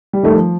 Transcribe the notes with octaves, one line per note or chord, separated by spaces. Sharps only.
G3
D#3 A3
F3